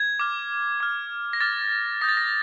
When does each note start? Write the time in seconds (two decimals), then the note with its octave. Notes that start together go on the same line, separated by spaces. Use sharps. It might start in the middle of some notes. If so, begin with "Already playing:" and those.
Already playing: G#6
0.19 D6 F6
0.80 D6 F6
1.33 A#6
1.41 D6 F6 A6
2.01 D#6 G6 A#6
2.09 A6
2.17 A#6